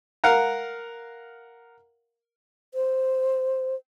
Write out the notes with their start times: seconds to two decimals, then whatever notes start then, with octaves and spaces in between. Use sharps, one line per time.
0.24 A#4 F5 F#5 A#5
2.74 C5